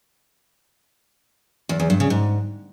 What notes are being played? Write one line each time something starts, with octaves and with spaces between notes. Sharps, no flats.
E2
E2
G2
C#3
G#2